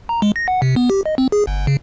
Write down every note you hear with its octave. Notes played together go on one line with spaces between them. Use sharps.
A#5
G#3
A#6
F#5
C3
B3
G4
D#5
C4
G#4
G1
C#3